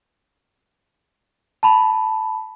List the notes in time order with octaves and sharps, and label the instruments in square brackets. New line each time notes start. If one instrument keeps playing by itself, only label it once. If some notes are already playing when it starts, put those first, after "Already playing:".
[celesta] A5 B5